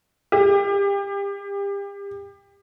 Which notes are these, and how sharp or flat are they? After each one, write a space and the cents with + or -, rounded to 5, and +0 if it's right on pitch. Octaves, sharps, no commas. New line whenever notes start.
G4 +30